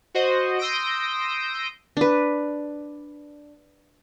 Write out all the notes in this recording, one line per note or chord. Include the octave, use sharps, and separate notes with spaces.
F#4 C5 D#5
C6 D#6 E6 G6 A#6 D7
D4 B4